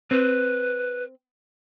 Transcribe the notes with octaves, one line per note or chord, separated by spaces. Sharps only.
C4 B4